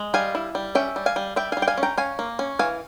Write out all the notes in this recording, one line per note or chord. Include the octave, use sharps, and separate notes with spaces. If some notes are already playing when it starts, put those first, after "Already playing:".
Already playing: G#3
G3 F5 G#5
E4
G3
C#4 E5 G5
G3
F5 G#5
G3
G3 E5 G5
G3 F5 G#5
G5
F5 G#5
C#4
G5 A#5
C#4 F5 G#5
A#3
C#4
E3 F5 G#5